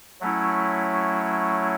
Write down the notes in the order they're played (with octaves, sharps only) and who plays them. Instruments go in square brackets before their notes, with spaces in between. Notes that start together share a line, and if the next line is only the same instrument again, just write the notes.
[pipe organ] F#3 A3 C#4 E4